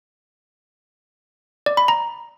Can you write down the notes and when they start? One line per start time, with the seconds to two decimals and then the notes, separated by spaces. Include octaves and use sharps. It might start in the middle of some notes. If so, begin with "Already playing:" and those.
1.66 D5
1.77 B5
1.88 A#5